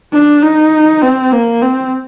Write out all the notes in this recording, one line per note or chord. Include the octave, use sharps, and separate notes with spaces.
D4
D#4
C4
A#3
C4